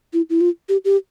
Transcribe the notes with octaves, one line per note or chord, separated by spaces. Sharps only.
E4
E4
F4
G4
G4